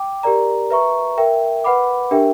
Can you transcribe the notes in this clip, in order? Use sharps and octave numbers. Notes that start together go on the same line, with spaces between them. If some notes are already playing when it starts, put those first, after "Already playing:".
Already playing: G5 D6
G4 A#4 D5 A#5
B4 E5 A#5 C#6
A#4 E5 G5
B4 F#5 B5 D6
D4 G4 A#4 E5 G5